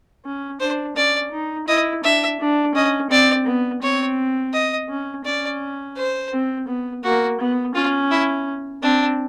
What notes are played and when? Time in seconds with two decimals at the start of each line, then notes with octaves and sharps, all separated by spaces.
0.25 C#4
0.60 D4 C5
0.96 C#4 D5
1.32 D#4
1.67 E4 D#5
2.04 D4 E5
2.40 D4
2.75 C#4 D#5
3.10 C4 D5
3.46 B3
3.82 C4 C#5
4.53 D#5
4.89 C#4
5.25 C#4 D5
5.97 C5
6.32 C4
6.68 B3
7.04 A#3 F#4
7.40 B3
7.75 C#4 F4
8.11 E4
8.83 C4 D4